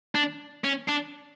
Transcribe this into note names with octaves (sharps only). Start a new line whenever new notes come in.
D4
C#4
D4